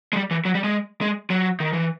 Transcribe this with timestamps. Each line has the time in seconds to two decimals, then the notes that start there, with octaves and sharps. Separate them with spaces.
0.13 G#3
0.16 G3
0.31 E3
0.45 F#3
0.55 G3
0.64 G#3
1.01 G#3
1.30 F#3
1.60 D#3
1.73 E3